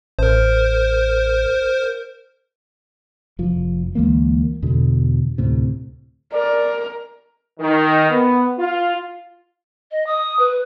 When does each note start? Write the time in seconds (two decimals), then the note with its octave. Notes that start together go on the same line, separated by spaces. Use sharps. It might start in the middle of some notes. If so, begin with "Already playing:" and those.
0.19 A1 A#4 C5
3.39 F1 F3
3.95 D2 E3 G#3 A#3
4.62 E2 B2 D3
5.38 D2 A2 C3
6.33 A#4 D5
7.59 D#3
8.10 B3
8.59 F4
9.91 D#5
10.06 D#6
10.39 B4